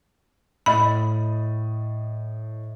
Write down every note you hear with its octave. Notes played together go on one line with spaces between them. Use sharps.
A2 D#5 B5 A6